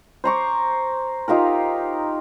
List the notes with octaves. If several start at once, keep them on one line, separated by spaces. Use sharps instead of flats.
C5 A#5 C#6 D6
D#4 F4 G4 A#4